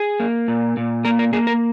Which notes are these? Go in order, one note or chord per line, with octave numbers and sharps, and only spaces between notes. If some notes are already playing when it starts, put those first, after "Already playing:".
Already playing: G#4
A#3
A#2
A#2
A#3 A#4
A#4
A#3 G#4
A#4